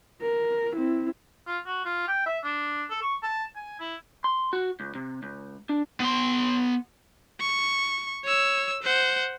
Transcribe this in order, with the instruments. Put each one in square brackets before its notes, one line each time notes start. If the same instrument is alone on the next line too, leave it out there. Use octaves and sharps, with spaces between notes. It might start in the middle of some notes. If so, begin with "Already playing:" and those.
[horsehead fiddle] A#4
C4 E4
[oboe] F4
F#4
F4
G5
E5
D4
A4
C#6
A5
G#5
E4
[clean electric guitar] C6
F#4
C#2
C3
C#2
D4
[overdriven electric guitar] B3 C6
[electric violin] C#6
C#5 E6
C5 F#5